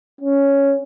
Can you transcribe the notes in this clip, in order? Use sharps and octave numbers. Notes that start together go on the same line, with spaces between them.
C#4